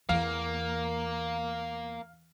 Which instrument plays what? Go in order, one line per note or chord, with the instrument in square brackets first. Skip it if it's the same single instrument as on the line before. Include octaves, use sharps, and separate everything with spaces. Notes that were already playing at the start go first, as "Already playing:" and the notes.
[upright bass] E2 [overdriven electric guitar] A#3 [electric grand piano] F5